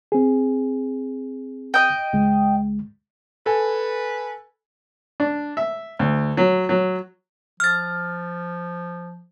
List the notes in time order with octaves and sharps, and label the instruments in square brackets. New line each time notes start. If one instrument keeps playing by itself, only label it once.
[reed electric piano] C4 G#4
[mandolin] D#5 G5
[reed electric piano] C#2 G#3
[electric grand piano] A4 G#5 [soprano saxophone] B4
[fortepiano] D4
E5
D2
F#3
F#3
[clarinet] F3 [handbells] F6 A6